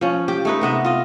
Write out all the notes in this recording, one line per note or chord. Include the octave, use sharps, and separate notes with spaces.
F3 C#4
G4
A3 D#4 B4
C3 B3 D#5 E5
F4 D#5